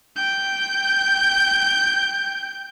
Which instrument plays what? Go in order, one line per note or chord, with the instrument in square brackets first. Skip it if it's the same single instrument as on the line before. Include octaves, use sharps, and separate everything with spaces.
[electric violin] G5 G6